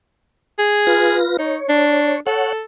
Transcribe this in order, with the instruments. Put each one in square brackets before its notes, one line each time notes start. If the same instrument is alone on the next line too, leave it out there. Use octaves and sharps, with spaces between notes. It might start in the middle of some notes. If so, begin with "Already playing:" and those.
[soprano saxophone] G#4
[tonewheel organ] F4 B4 A#6
[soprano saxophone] D#4 [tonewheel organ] C#5
[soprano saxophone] D4
[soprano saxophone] A4 [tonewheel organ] C#5 F#5